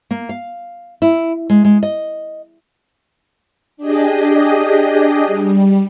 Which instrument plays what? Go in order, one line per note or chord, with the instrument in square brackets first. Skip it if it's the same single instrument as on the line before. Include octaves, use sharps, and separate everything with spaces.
[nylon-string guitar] A#3
F5
E4
G#3
G#3
D#5
[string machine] D4 G4 G#4 D#5
G3